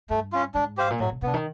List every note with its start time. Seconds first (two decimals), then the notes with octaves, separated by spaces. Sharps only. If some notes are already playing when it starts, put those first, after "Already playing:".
0.10 G2 A3
0.32 C#4 F4
0.54 G#2 D4
0.77 G4 C5 F5
0.90 A#2
1.00 A2 F#3
1.12 B2
1.22 C3 B3 D4
1.34 D#3